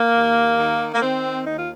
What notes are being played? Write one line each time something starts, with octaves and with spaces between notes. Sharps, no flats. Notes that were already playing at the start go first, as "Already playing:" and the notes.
Already playing: A#3
D#2
D#3
A#3
D#3 C4
D#2 D#4
F4